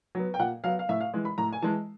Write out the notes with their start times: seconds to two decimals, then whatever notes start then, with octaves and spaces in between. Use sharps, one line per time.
0.15 F#3 B3
0.34 G5
0.39 A#2 F#5
0.64 F#3 B3 F5
0.79 F5
0.89 A2 E5
1.00 F5
1.14 E3 G#3
1.25 B5
1.38 A2 A#5
1.53 G#5
1.62 E3 G#3 A5